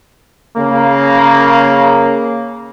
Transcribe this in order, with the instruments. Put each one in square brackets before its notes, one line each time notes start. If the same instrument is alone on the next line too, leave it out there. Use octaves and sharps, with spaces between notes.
[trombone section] C#3 A#3